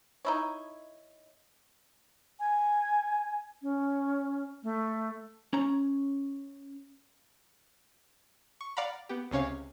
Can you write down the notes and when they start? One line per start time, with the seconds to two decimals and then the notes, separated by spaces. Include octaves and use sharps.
0.25 D#4 E4 C#5
2.40 G#5
3.62 C#4
4.63 A3
5.53 C#4 C#5 A#5
8.61 C#6
8.77 D5 F5 F#5 A#5 B5
9.09 B3 G4
9.31 C#2 C3 C#4 C#5 F5